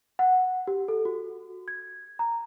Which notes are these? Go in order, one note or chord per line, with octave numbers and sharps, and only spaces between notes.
F#5
G4
A4
F#4
G#6
A#5